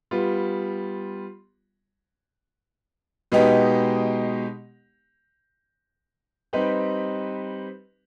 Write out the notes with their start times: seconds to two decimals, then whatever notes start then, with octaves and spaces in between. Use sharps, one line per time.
0.11 G3 B3 F4
3.32 B2 G#3 B3 D#4 G4
6.53 G3 C4 D#4 G4 B4